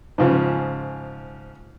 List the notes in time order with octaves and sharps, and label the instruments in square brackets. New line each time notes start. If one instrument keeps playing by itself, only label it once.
[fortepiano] G#2 C#3 F3